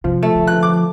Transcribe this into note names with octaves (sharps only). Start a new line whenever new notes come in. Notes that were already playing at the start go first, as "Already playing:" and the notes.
C3 F3 F#3
A3
D3
F#6
D6